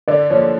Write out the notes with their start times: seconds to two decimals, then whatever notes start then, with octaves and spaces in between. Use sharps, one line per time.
0.08 D3 D5
0.30 F3 A#3 C#5